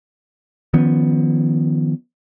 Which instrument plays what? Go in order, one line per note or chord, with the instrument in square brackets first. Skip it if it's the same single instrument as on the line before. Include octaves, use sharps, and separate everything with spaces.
[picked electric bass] D#3 F3 B3 C#4